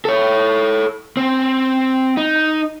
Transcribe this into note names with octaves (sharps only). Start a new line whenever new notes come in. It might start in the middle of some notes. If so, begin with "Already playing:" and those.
A4 C#5
C4
D#4